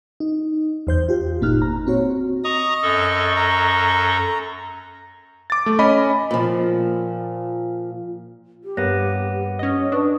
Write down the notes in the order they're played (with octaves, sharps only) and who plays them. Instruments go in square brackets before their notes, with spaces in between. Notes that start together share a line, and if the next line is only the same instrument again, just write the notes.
[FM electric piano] D#4
E2 C5 G6
F4 G4
G1 A#2 A#3 D#4 F6 F#6
A#5
C4 F#4 C#5
[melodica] D#5 [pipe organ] A#5 C#6 D#6
[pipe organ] F#2 A4 C#6
[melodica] A#5
[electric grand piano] D6 A6
A3
C#4 D#5 B5
[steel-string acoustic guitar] A#2 F3
[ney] G4
[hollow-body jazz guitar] G2 A#3 B3 [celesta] C#5 F#6 A#6
[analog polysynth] C#4 D#5
[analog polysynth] D4 [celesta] B4 C#6 D#6